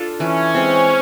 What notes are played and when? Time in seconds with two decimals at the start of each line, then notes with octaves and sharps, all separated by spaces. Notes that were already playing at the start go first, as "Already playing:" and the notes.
Already playing: D4 F4 A4
0.20 E3 C#4
0.54 G#3 C4